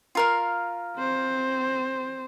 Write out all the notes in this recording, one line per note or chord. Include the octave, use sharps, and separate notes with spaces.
F4 A#4 F5
C4 C5